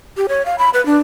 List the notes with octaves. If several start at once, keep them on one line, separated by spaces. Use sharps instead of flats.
G4
C#5
F5
B5
B4
D4